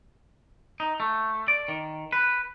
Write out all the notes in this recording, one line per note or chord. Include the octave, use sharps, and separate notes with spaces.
D#4
A3
D5
D#3
B4